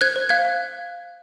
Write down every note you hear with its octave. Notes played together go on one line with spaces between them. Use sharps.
C5 F#6 G#6
C5
F5 F#6 G#6
F5